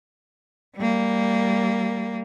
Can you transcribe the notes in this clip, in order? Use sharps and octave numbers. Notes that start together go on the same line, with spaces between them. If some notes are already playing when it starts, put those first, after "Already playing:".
G3 A#3